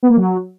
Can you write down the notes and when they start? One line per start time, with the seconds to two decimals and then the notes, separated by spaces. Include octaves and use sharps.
0.03 B3
0.10 A#3
0.17 F#3